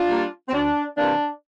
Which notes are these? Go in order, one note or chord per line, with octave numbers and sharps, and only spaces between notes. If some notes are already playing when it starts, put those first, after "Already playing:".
Already playing: D4 F4
G3 A#3
C4
D2 D4
C3 E3 A#3 D4